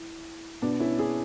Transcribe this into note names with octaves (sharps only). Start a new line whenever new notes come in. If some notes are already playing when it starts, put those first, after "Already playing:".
Already playing: E4
B2 B3 D4
C#4 E4
E4 G#4